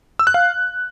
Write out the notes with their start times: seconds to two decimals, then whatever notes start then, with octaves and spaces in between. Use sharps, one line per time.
0.19 E6
0.27 F#6
0.34 F5